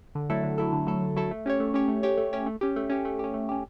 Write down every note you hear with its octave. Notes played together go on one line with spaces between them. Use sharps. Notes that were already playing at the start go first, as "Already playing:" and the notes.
D3
F#3 A3 E4 A4
D3
F#3 A3 E4 A4
D3
F#3 A3 E4 A4
D3
F#3 A3 E4 A4
A3
C#4 G4 C#5
A3
C#4 G4 C#5
A3
C#4 G4 C#5
A3
C#4 G4 C#5
A3
C#4 G4
A3
C#4 G4
A3
C#4 G4
A3
C#4 G4